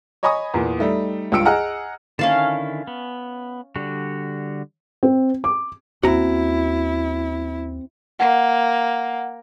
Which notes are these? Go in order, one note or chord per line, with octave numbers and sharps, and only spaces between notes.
C#5 D#5 G#5 B5 C#6 D#6
E2 A#2
G3 A3 D#4
C#2 G2 F4 E6 C#7 D7
G#4 D#5 F#5 A#5 F6
D3 D#3 C#4 E4 F5 A5
B3
D3 G3 F#4
C4
D6
D#2 C4 C#4 E4 F#4 A#5
A#3 F#5